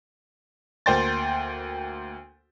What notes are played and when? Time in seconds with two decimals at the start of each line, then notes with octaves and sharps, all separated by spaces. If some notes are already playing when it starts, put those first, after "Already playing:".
0.86 D2 A#3 C5 G5 C6 A6